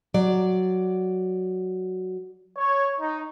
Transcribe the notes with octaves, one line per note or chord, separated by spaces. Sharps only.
F#3 D5
C#5
D#4